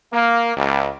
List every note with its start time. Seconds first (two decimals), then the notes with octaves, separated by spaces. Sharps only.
0.11 A#3
0.55 C#2